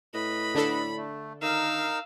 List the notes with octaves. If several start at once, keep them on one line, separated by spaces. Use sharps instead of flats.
A2 B4 D#5 B5
D3 D4 A4
A3
D#3 D#4 A#4 F5 E6